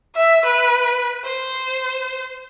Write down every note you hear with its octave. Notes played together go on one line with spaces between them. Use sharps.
E5
B4
C5